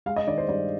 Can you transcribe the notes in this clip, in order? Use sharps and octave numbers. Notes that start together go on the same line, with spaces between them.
G#3 F5
D#5
D#3 D5
C5
G2 D5